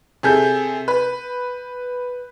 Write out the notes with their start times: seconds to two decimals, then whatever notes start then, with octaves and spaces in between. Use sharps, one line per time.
0.23 C3 G#4 A4 G6
0.88 B4